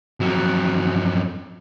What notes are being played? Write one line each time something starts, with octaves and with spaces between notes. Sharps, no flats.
F2 F#3